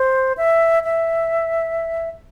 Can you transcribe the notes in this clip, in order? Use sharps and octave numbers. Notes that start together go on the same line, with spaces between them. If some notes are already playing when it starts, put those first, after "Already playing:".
Already playing: C5
E5
E5